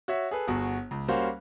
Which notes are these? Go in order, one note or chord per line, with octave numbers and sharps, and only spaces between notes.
F#4 C#5 E5
G#4 A4 B4
G1 F#4 G#4
C#2
G3 A#3 C#4 F#4 C5 F5